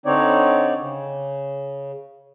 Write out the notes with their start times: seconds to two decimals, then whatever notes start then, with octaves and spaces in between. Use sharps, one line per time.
0.06 D3 C4 D#4 C#5 D5
0.79 C#3